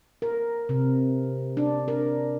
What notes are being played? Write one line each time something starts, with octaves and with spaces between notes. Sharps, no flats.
A#4
C3
D4
A#4